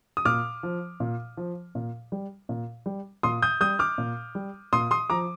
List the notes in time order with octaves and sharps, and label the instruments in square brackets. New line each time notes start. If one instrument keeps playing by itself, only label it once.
[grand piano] D#6
A#2 D6 F6
F3
A#2
F3
A#2
G3
A#2
G3
A#2 C6 D#6
D#6 G6
G3 D#6 G6
D6 F6
A#2
G3
A#2 C6 D#6
C6 D#6
F3 A#5 D6